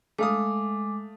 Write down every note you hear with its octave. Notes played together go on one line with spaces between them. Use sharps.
G#3 A3 F5 D6 D#6